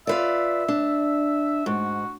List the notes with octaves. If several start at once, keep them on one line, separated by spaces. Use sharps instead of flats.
F4 B4 D5 E5
D4
G#2 F#4